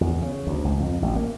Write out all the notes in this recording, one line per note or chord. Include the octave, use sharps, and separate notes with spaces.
E2
C#3
D2
C#2
F2
A1
A#3